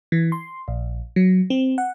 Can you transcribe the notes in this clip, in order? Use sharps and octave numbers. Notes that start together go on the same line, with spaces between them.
E3
C6
A#1
F#3
C4
F#5